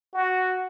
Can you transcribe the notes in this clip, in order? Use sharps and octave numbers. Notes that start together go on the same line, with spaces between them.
F#4